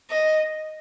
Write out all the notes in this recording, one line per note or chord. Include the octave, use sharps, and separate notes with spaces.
D#5